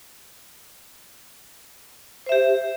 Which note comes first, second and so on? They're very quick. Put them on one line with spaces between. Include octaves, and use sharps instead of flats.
C5 E5 G4